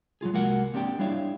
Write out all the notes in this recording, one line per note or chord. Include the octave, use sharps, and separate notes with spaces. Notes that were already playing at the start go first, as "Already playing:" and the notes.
F#3 G#3 F4 G#4
C2 G#3 A#3 F#4 A#4 F#5
A#3 C4 D4 G4 D5 G5
G3 D4 E4 C#5 E5 F5